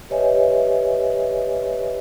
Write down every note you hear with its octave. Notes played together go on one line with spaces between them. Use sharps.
G4 B4 C#5 D#5 E5 G#5